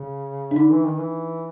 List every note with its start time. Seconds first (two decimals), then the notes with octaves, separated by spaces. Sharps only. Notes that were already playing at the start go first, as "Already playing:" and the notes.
Already playing: C#3
0.51 D4
0.56 D3 D#4
0.71 E3
0.86 D#3
1.00 E3